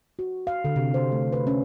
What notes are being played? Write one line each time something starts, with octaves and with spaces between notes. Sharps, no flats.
F#4
F5
D3
C3
C5
A3
B4
C#4